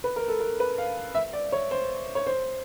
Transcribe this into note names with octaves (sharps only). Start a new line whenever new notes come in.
B4
A#4
A4
A#4
B4
F5
E5
D5
C#5
C5
C#5
C5